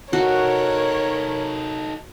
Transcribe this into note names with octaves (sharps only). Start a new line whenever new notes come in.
D#4 F#4 A4 A#4 C#5